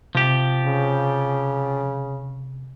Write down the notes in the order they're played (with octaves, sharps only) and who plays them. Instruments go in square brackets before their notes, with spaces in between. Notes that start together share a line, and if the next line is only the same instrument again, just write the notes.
[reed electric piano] C3 [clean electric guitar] F3 G4
[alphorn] C#3